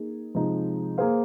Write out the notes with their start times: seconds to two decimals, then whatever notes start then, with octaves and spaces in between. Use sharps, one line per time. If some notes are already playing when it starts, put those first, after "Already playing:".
Already playing: A#3 D#4 G#4
0.35 C3 F3 G#3 D#4
0.98 A#3 G#4 C5 F5